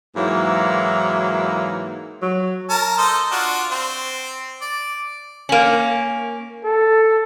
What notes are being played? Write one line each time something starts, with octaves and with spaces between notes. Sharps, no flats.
G#2 E3 F#3 A#3 E4
F#3
A#4 A5
A4 C5 D#5
D4 F4 F#4
C4
D5
A#3 C#4
A4